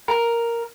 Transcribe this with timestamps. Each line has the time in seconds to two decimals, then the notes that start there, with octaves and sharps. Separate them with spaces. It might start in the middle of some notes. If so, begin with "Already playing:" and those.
0.08 A#4